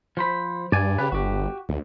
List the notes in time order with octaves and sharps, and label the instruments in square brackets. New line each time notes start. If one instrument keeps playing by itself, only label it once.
[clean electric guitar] F3 C5 B5
[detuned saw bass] G2 [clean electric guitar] D5 G#5
[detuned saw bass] C#3 [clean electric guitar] G4 B4
[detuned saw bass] G1 [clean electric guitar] F#4 G4
[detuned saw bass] D2